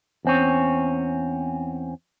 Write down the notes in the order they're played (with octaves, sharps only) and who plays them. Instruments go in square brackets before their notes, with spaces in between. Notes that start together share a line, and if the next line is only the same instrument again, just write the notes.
[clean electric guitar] E2 C4 C#4